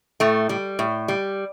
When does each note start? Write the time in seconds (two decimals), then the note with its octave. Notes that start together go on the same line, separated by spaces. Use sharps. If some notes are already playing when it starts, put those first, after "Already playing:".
0.20 A2 A3
0.49 G3
0.79 A2
1.08 G3